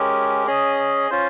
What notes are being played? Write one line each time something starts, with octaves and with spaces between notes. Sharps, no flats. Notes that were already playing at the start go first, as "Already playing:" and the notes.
Already playing: G#3 C#4 G4 A#4
C#4 G#4 D#5
C#4 F4 C5